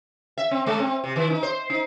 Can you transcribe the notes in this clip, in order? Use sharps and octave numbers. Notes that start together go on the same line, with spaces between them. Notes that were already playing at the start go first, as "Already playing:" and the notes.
E5
C4
G#3
C4
C3
D#3
D#4
C5
D#4